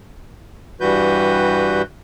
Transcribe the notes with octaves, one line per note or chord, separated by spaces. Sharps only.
G2 E3 G3 F#4 B4 G6